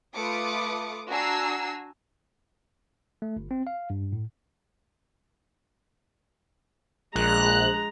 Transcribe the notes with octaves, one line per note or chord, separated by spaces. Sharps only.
A3 F4 B4 D6 D#6 C#7
D4 F#4 G#5 A#5 E6 C7
A3
G1
C4
F5
G2
A2
A#1 G#3 A#5 F#6